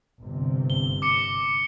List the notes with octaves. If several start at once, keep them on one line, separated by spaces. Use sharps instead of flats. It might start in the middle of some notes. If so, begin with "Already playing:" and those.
G1 C3
G7
D6 C#7